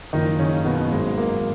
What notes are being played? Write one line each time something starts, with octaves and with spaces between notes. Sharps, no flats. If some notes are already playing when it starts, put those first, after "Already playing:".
F#1 F#2 D#3 F3 D#4
C#3 C#4
B2 B3
G#1 G#2 D#3 F#3 G#3
A#3